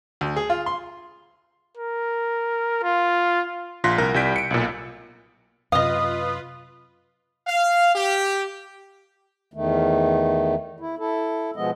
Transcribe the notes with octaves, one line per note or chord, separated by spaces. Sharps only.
D2
G#4
F4
C6
A#4
F4
A#1 F4 C6 F#6 A#6 B6
C2 A#4 A#6
C2 G3 G6 B6 D7
C#7 D7
B1 A#2
F#2 C3 F4 B4 D#5 F5 D#6
F5
G4
E2 D#3 A3
E4
E4 A4
B2 F3 G#3 B3 D#5